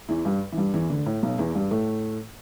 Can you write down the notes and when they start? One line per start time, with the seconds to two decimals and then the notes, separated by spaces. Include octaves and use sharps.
0.09 E2 E3
0.25 G2 G3
0.52 E3
0.57 G2 G3
0.73 E2 E3
0.90 D2 D3
1.06 A2
1.23 B1 B2
1.38 E2 E3
1.55 G2 G3
1.71 A2 A3